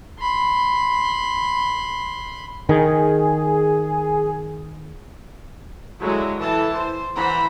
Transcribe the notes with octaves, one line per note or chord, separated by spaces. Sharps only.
B5 C6
D#3 G#4
D3 F#3 G#3 E4
E3 A4 A5
C5
E3 C5 F#5 A#5 B5